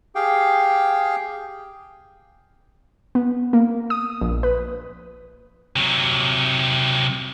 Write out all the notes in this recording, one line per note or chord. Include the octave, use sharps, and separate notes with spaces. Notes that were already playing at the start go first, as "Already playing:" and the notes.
G4 G#4 F5 G5
B3
A#3
D#6
A#1
B4
C3 F#3